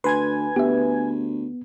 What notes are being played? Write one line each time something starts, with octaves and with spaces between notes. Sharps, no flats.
D2 B4 G#5 C6 G#6
D2 B3 G4 E5